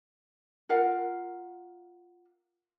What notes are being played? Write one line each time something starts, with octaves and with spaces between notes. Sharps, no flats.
F4 A#4 F5 F#5